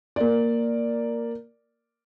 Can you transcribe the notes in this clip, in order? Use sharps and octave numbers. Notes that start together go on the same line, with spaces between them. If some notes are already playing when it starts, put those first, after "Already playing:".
A#3 A#4 D5